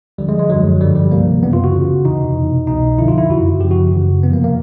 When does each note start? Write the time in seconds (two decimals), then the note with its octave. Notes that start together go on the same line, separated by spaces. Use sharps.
0.18 D#2 D3 F3 G3
0.29 G#3
0.39 G#3
0.49 F#2 D3 F3 F#3
0.81 G2 D3 F3 G3
0.96 G3
1.11 C#2 C3 F3 A#3
1.43 F#2 C#3 E3 B3
1.53 F4
1.64 F#4
1.74 D#2 C#3 E3
2.05 F2 C3 E3 D#4
2.36 E2 B2
2.67 C2 B2 D#4
2.98 F2 D3 F3 E4
3.08 F4
3.18 E4
3.30 F#2 C#3 E3 F#4
3.61 F#2 C#3 F3 G4
3.71 F#4
3.92 F#2 C#3 E3
4.23 F2 C3 F3 B3
4.33 A#3
4.44 A#3